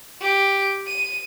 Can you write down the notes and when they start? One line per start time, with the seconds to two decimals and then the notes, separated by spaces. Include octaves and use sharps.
0.21 G4
0.88 D#7